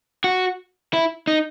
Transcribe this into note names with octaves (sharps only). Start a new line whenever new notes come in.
F#4
E4
D#4